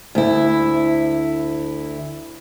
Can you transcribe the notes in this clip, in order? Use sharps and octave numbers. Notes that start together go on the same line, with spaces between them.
D2 E4